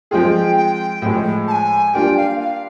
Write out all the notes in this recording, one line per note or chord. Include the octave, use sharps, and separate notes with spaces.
F3 G#3 C4 F4 G#4 G5
G5
A2 F3 G#3
A5
G#5
G3 A#3 D4 F4 G5
F5
F5